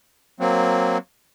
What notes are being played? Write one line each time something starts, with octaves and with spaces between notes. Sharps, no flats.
F#3 A#3 C4